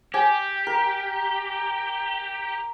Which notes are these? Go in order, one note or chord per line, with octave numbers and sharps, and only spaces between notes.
G4 G5 G#5
A#4